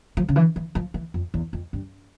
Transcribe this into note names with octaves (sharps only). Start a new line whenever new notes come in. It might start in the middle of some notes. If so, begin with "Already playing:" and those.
F3
C#3
E3
E3
F3
E3
F2
E2
F2
G2